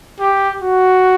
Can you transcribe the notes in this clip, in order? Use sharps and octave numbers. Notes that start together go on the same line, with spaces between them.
G4
F#4